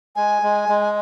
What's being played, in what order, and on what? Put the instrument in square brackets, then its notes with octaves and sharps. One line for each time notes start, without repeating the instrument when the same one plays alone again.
[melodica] G#3 [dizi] G#5
[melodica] G#3
G#3